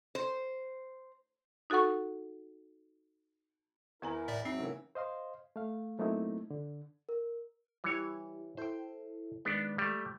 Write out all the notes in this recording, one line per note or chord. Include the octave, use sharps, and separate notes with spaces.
C5
D#4 F#4 A4 F#5 C#6
E2 D#3 E4 A#4 G#5 A#5
A2 D5 E5
G#2 F#3 C4 D#4 E5
C#3 E3 A#3
C5 D#5 F5 C6
A3 F5
F#3 A3 A#3 C4 D#4 E4
D3
A#4
E3 G3 E4 G4 C#5
E4 A4 C5 G5
D#3 G#3 B3 D4
G3 A3